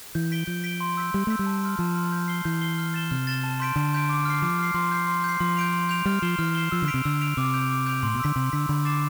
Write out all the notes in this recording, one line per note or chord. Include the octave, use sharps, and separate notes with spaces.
E3 G6
B6 D7 G7
F3 G6
B6 D7 G7
C6
E6 G6 B6
G3 C6
A3 E6 G6 B6
G3
A5
C6 F6
F3 A5
C6 F6
G6
C7 G7
E3 G6
C7 G7
F6
A6 E7 G7
C3 F6
A6 E7 G7
A5
C6 G6 B6 D7
D3 A5
C6 G6 B6 D7
D6
F6 C7
F3 D6
F6 C7
F3 C6
G6 C7
C6
G6 C7
F3 C6
G6 D7 F7
C6
G6 D7 F7
G3 F6
F3 C7 E7 G7
E3 F6
C7 E7 G7
F3 E6
D3
B6 D7 F7
C3
D3 E6
B6 D7 F7
C3 D6
G6 D7 F7
D6
G6 D7 F7
A2 C6
B2
D3 E6 B6
C3 C6
D3 E6 B6
D3 B5
D6 A6 C7 E7